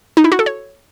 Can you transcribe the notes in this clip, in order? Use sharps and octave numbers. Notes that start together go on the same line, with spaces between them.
D#4
E4
F#4
A4
C#5